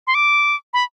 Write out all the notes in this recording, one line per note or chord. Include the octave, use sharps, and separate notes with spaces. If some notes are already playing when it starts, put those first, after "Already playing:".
C6
D6
B5